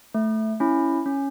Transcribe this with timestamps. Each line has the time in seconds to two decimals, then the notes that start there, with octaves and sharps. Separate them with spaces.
0.15 A3
0.60 C#4 E4
1.06 C#4